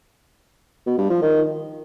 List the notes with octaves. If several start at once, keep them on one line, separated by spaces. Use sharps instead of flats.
B2
G2
F3
D#3